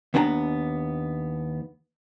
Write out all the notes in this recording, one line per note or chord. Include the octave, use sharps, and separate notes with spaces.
D#2 B3 D4 G#5 A#5